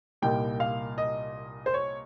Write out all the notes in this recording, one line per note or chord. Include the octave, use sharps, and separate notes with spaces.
C2 A#2 G3 A#3 D#4 G5
F5
D#5
C5
C#5